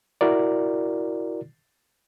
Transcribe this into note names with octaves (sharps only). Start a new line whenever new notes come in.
E4 F#4 A#4 D5